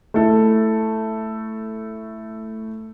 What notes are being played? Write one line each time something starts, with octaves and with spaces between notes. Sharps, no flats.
A3 E4 A4